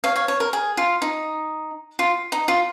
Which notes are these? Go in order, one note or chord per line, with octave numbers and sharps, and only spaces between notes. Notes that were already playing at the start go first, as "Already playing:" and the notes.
C#5 F5
C#5 F5
C#5
A#4
G#4
F4
D#4
F4
D#4
F4